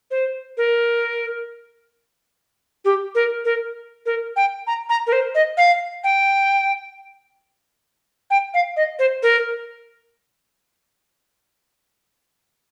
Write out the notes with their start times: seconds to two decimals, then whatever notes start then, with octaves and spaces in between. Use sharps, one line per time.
0.11 C5
0.57 A#4
2.85 G4
3.15 A#4
3.45 A#4
4.06 A#4
4.36 G5
4.67 A#5
4.89 A#5
5.07 A#4
5.12 C5
5.35 D#5
5.57 F5
6.04 G5
8.30 G5
8.54 F5
8.76 D#5
8.99 C5
9.23 A#4